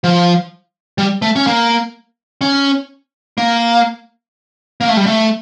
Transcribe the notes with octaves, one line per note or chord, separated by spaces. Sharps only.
F3
G3
A3
C#4
A#3
C#4
A#3
A#3
A3
G3
A3